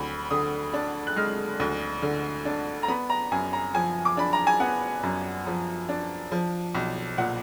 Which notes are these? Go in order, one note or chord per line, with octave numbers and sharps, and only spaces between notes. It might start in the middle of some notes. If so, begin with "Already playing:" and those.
Already playing: D2 B5
D3 D#6
D4
F#6
G#3 F6
D2
D3
D4
A#5
B3 B5
A#5
F#2 G#5
A#5
F3 G#5
D6
D4 B5
A#5
G#5
B3 F#5
F#2
F3
D4
F3
B1
A#2 F#5